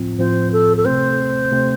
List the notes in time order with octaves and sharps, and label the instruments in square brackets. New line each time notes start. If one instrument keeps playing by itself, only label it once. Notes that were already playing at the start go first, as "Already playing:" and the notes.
Already playing: [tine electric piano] A2 F3 C4 F4
[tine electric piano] A2 F3 C4 F4 [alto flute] C5
[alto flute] A4
A4
[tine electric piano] C3 A3 C4 [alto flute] C5
[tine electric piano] C3 A3 C4